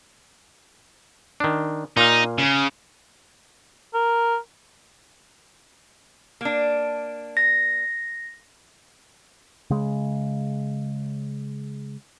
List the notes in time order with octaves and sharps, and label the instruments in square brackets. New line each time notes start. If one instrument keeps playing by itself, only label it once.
[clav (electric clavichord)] D#3 D4
[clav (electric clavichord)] A#2 F5 [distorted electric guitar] D#4
[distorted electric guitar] C#3
[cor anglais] A#4
[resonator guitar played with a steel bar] A#3 D4
[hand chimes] A#6
[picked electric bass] C#3 G#3